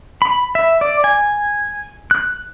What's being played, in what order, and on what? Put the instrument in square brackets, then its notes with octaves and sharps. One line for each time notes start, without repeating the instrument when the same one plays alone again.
[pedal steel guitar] B5
E5
D5
G#5
F#6